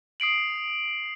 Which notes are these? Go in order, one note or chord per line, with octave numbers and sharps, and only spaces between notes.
D#6 C7 D7 F#7